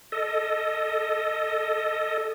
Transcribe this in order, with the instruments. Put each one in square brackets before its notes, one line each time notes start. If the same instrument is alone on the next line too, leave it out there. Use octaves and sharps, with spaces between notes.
[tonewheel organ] A4 D#5